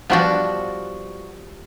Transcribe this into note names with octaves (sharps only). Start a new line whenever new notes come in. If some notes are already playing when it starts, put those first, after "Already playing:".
F3 G3 B3 D4 F#4